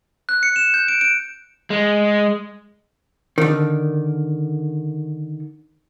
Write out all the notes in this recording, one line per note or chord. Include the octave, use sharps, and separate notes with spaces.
F#6
C#7
E7
G6
D7
D7
G#3
D3 D#3